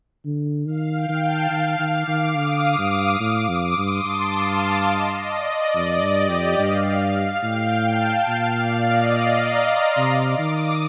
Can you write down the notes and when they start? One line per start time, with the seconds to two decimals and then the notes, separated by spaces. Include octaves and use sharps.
0.25 D3
0.67 D#3 F5
0.95 G5
1.09 D#3
1.23 A5
1.51 D#3 F5
1.79 D#3
1.94 D6
2.08 D#3
2.36 D3 D#6
2.78 G2 D6
3.20 A2 D6
3.49 F2 D#6
3.77 G2 C6
4.04 G2 A5
4.34 F5
4.62 F5
4.90 D#5
5.32 D5
5.75 F2
6.03 G2
6.16 G4
6.30 F2
6.58 G2 F5
7.01 F5
7.43 A2 G5
7.86 A5
8.28 A#2 F5
8.56 D5
8.84 D#5
9.12 F5
9.41 A#5
9.69 C6
9.97 C3 D6
10.39 D#3 D#6